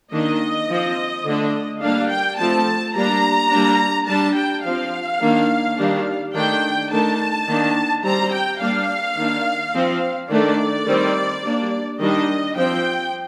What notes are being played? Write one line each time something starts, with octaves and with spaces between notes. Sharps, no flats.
D#3 A#3 D4 D#5
F3 C4
D3 A3 D4
G3 A#3 D4 F5
G5
F3 A3 C4 A5
G3 A#3 D4 A#5
G3 A#3 D4
G3 D4 A5
G5
F3 C4 F5
D#3 A#3 D4
D#3 G3 D4
D#3 A3 D4 G5
D#3 A3 D4 A5
D#3 A#3 D4
G3 C4 A#5
G5
G3 A#3 D4 F5
D#3 A#3 D4
F3 C4
D#3 A3 D4 D5
D#3 G3 C4
G3 A#3 D4
D#3 G3 D4 D#5
F3 C4 G5